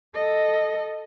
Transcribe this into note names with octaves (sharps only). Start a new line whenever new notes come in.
A4 D#5